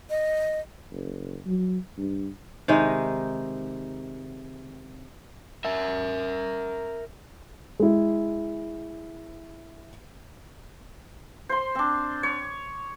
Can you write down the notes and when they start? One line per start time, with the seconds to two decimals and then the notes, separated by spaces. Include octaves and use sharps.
0.10 D#5
0.91 F#1
1.46 F#3
1.98 G2
2.68 C3 D#3 G#3 D#4
5.65 A#4 E5
7.80 G#3 E4
11.49 C5 C6
11.75 C4 D4
12.23 C#5